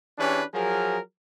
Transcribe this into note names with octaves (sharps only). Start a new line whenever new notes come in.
E3 C#4 D4 G4 G#4 B4
F3 F#3 G#4 A#4